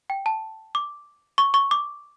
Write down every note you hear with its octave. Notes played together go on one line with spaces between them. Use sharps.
G5
A5
D6
C#6
C#6
D6